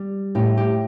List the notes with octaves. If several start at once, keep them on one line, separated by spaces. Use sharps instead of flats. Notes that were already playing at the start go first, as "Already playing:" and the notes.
Already playing: G3
A2 G4
G4